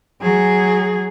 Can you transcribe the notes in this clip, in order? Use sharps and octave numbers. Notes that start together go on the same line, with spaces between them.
F#3 G#4